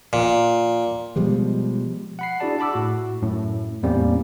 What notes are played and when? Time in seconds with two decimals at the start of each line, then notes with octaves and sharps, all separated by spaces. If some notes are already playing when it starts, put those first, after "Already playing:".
0.13 A#2
1.16 B2 F3 G3 G#3
2.19 F#5 B5 C7
2.40 D4 E4 F#4 G#4 D5 A5
2.59 F#5 A5 B5 D6 E6
2.74 A2 F#4
3.22 F#2 A2
3.83 E2 A2 G3 A#3 C4 C#4